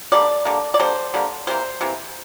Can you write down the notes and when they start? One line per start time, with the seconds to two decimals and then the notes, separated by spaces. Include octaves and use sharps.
0.12 D3 G3 A#3 D5
0.45 D3 G3 A#3
0.74 D5
0.80 D3 G3 A#3 C5
1.14 D3 G3 A#3
1.47 C3 E3 A#3 C5
1.81 C3 E3 A#3